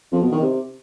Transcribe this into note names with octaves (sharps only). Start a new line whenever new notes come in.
F2
B2
D#3
C3